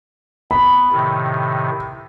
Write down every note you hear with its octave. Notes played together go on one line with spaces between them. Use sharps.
B3 B5
A2 C3 D#3